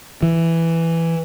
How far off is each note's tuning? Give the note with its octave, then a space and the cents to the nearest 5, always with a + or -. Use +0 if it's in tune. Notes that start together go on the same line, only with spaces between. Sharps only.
E3 +5